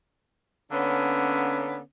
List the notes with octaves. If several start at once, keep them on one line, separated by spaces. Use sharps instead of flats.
D3 A#3 B3 C#4